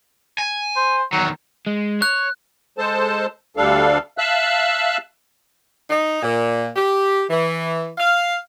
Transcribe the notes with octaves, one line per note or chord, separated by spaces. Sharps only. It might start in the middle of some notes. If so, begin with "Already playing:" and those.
G#5
C5
E2 D#3 F#3
G#3
C#5 F#6
G#3 A4 C5 A5
D2 G3 D4 A4 F5
E5 F5 A5 E6 F#6
D#4
A#2
G4
E3
F5